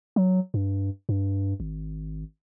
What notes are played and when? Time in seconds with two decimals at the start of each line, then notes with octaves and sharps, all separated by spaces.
0.16 F#3
0.54 G2
1.09 G2
1.60 G#1